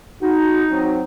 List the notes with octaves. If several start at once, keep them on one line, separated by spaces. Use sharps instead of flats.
D#4 F#4
F#3 C4 F#4